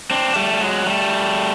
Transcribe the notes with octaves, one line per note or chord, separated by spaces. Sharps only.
C4 D4
G3 A3
G3
F#3 G#3
G3 A3